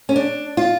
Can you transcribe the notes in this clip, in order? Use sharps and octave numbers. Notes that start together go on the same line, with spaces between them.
C#4
D4
F4